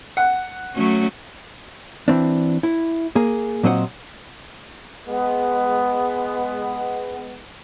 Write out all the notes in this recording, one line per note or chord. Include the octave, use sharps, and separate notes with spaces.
F#5
F#3 A3 C#4
E3 C4 D4
E4
A#3 G#4
A#2 F#3 C4 C5 D#5 F#5
G#3 B3